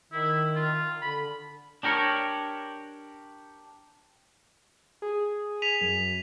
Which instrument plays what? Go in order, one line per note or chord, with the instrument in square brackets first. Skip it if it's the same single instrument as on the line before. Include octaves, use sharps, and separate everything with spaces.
[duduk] D#3 [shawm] E4
[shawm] F4
[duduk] D3 [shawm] B5
[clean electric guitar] D4 G4 A#4 C#5
[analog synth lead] G#4
[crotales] B6 D#7 F7
[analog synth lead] F#2